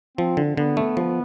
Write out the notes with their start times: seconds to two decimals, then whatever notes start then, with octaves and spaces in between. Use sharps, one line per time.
0.17 F3 C4
0.37 D3
0.57 D3 B3
0.77 A3
0.97 F3